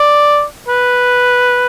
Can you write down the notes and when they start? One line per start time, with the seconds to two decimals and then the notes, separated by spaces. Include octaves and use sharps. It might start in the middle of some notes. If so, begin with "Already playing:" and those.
Already playing: D5
0.68 B4